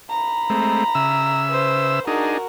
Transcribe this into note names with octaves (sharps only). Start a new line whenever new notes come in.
A#5 B5
G#3 A3 C4
C#3 E5 E6
B4 C5
D4 D#4 F#4 G#4 A#4